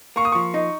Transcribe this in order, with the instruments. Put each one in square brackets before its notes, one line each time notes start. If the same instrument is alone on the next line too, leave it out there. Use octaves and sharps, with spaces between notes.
[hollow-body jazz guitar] A#3 [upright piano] C#6
[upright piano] D#6
[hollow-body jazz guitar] F3 [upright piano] C#6
[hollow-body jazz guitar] D#4